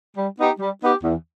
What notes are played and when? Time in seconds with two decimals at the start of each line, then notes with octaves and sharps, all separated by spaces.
0.16 G3
0.38 B3 D#4 G4
0.59 G3
0.82 B3 D#4 G4
1.04 E2